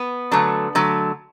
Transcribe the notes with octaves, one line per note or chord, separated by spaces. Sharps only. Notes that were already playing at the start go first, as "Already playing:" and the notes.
Already playing: B3
D3 F#3 A3
D3 F#3 A3